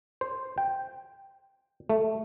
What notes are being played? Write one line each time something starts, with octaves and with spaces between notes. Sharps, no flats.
C5
G5
A3